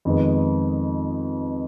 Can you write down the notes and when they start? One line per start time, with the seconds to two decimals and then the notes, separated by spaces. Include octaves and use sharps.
0.05 F2 D#3 G#3 B3